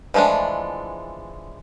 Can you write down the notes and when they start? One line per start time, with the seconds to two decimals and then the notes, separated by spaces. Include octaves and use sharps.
0.14 E3 F3 G#3 A3 D4